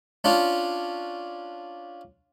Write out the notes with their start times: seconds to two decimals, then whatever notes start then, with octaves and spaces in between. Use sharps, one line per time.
0.24 C#4 D4 F4